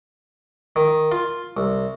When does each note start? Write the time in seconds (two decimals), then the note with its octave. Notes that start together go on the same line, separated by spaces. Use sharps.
0.76 D#3
1.12 F4
1.57 C2